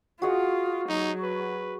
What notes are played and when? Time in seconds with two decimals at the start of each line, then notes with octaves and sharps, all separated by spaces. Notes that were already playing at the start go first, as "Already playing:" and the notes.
0.22 F4 F#4 G#4 D#5
0.89 F#3 D#4
1.24 B4